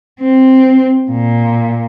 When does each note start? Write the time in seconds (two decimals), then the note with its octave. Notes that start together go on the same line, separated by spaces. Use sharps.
0.21 C4
1.11 A#2